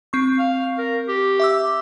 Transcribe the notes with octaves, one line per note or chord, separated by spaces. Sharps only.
C4 C#6
F5
A#4
G4
E5 D6 E6